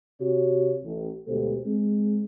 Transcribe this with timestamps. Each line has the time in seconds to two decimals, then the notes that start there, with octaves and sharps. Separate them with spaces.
0.21 C3 F#4 C#5
0.84 A1
1.27 D2 B2 G#3 G4 A4 C5
1.66 G#3 C4